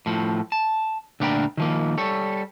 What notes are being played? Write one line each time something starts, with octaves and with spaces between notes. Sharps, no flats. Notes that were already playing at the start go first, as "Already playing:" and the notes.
A2 F3
A5
D2 A#2 D4 A#4 G5 B5
D#3 F3 A#3
G3 A4 C#5